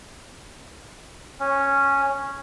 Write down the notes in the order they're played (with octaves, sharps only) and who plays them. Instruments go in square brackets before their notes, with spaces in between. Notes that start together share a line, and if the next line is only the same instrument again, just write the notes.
[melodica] C#4